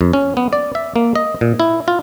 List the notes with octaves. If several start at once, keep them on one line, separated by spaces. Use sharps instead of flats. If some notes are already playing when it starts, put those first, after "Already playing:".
F2
C#4
B3
D5
E5
A#3
D#5
A#2
E4
F4